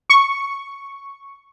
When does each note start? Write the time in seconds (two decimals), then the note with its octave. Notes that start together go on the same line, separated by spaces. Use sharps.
0.10 C#6